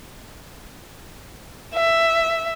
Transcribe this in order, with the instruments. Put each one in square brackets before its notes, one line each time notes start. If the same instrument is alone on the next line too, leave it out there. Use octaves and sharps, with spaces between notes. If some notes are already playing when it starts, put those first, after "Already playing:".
[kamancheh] E5